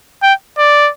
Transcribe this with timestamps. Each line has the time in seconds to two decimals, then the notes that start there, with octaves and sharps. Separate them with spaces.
0.23 G5
0.58 D5